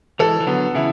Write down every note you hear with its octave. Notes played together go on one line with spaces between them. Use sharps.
E3 G#3 A4
E3
D3 F#3 B3
C#3 E3 E4